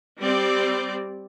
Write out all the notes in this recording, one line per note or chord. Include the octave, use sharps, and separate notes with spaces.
G3 C4 D5